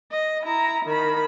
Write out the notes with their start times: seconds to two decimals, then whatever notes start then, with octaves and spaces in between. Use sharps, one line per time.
0.12 D#5
0.42 E4 A#5
0.85 D#3 B5